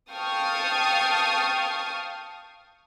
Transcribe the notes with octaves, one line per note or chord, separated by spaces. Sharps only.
F5 G5 A5 C#6 D#6 F6